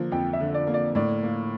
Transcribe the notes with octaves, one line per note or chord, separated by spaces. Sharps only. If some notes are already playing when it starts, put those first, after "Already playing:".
Already playing: D3 F3 A#3
F2 G5
E5
D3
D5
A#3
D5
A2 D5
A#3